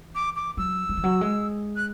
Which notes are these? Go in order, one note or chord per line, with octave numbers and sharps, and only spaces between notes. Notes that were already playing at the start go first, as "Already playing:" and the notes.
Already playing: E3
D6
D6
F#3 E6
F#3
E3
F#3
G#3
F#6